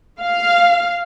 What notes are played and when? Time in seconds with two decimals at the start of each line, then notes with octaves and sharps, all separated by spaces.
0.21 F5